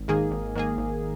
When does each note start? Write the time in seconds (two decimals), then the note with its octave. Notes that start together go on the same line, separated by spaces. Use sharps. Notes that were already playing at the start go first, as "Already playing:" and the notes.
Already playing: G#1
0.08 G#2 D#3 A#3 G#4
0.31 G#1
0.55 G#2 D#3 A#3 G#4
0.78 G#1